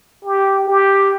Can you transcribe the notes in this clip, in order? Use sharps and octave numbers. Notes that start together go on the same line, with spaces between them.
G4
G4